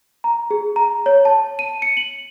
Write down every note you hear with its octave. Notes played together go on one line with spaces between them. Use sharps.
A#5
G#4
A#5
C#5
A5
D#7
C#7
F#7